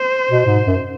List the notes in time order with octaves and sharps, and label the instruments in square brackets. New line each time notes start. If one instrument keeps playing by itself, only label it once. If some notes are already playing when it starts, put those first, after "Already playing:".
Already playing: [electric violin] C5
[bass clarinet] B2
G#2
F#2